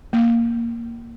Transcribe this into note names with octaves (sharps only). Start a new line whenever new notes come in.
A#3